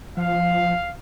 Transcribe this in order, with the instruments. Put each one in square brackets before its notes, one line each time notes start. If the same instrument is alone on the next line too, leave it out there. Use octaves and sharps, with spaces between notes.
[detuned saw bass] F3 [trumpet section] F5